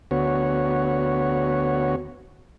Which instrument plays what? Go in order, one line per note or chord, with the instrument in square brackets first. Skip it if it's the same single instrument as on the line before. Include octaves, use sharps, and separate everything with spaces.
[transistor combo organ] D2 B3 F#4 C#5